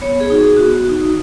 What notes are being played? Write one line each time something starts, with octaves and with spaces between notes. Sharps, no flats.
B3 C#5
G#4
D#4 F#4
G#4
B3 F#4
D#4 F#4